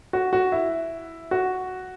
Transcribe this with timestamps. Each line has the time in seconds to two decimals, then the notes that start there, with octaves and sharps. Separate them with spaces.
0.13 F#4
0.33 F#4
0.52 E4
1.31 F#4